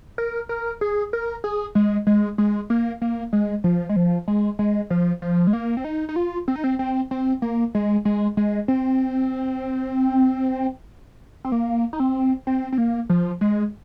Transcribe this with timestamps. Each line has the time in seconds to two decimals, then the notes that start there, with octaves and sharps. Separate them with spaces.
0.18 A#4
0.49 A#4
0.81 G#4
1.13 A#4
1.44 G#4
1.75 G#3
2.07 G#3
2.38 G#3
2.70 A#3
3.02 A#3
3.33 G#3
3.64 F3
3.89 G#3
3.96 F3
4.28 G#3
4.59 G#3
4.90 F3
5.22 F3
5.47 G#3
5.53 A#3
5.77 C4
5.84 D#4
6.09 D#4
6.16 F4
6.48 C4
6.56 D#4
6.64 C4
6.79 C4
7.11 C4
7.42 A#3
7.75 G#3
8.05 G#3
8.37 G#3
8.68 C4
11.45 C4
11.52 A#3
11.93 D#4
12.00 C4
12.47 C4
12.72 C4
12.78 A#3
13.09 F3
13.41 G#3